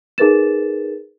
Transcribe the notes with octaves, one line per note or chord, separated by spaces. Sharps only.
D#4 G#4 A#4 B4 A6 E7